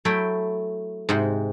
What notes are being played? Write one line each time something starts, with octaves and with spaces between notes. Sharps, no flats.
F#3 A3 E4 G5 B5
G#2 C3 F#5